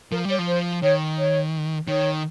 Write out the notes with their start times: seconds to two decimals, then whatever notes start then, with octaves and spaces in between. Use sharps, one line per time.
0.11 F3 A#4
0.25 G3 C#5
0.39 F3
0.47 C5
0.82 D#3 C#5
1.17 C#5
1.87 D#3 C#5